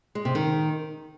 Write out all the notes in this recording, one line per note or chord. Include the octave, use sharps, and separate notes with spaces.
G#3
C3
D#3